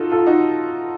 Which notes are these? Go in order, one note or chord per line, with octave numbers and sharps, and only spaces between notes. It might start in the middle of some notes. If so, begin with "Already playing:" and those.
Already playing: D#4 F4 F#4 A4
F4 A4
D#4 F#4